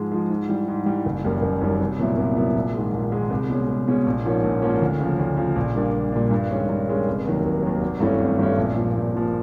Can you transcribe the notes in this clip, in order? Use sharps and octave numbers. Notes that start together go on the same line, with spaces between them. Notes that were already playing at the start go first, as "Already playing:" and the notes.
Already playing: G#2 F3 G#3
F3 G#3
G#2
E3 G3
G#2
E3 G3
F#1
F#2 D#3 G3 A#3
F#1
F#2 D#3 G3 A#3
C2
A#2 F#3 B3 E4
C2
A#2 F#3 B3 E4
A#1
G#2 D#3 G#3
A#1
G#2 D#3 G#3
C2
B2 G#3 C#4
C2
B2 G#3 C#4
A#1
G#2 F3 A#3 C#4
A#1
G#2 F3 A#3 C#4
D2
C#3 F3
D2
C#3 F3
A#1
A#2 G3 A#3 D4
A#1
A#2 G3 A#3 D4
G2
D#3 G#3 C#4
G2
D#3 G#3 C#4
F1
D#2 D#3 F#3
F1
D#2 D#3 F#3
G#1
G2 E3 A3 C#4
G#1
G2 E3 A3 C#4
A#1
A#2 F3
A#1
A#2 F3